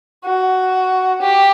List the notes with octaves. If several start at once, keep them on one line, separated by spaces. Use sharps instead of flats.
F#4
G4